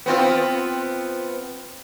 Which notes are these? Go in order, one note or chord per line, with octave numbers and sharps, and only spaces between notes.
B3 C4 F4